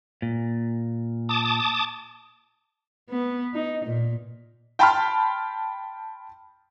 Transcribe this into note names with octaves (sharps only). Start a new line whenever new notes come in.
A#2
A5 D6 D#6
B3
D#4
A#2
G5 A5 B5 C6 F6